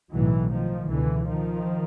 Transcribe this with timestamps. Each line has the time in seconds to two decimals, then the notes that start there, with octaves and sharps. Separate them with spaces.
0.12 B1 A2 E3 F#3
0.51 D#3 F3
0.89 C#2 B2 D3 E3
1.28 D#3 F3